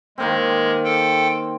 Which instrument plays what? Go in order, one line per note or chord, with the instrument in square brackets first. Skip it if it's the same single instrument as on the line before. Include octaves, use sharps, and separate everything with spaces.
[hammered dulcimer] D#3 A#3 C4 [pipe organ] G#3
[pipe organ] A4 G5